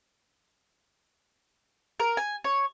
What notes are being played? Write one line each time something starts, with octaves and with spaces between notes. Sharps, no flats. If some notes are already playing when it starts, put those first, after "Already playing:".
A#4
G#5
C#5